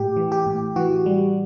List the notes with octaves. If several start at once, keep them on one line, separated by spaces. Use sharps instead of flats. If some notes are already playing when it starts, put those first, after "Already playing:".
Already playing: A2 G4
E3
G4
A2
E3 F#4
G3